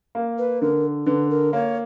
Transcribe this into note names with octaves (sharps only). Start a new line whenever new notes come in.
A#3
B4
D3 A#4
D3 B4
A#4
A#3 C#5